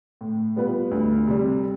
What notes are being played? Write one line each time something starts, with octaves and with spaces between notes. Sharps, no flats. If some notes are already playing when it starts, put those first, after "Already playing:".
A2
G3 B3 F4 B4
D2
C3 G3